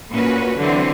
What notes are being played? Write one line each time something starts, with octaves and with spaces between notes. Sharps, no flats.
A#2 C#4 F#4 B4
D3 E3 F#3 C4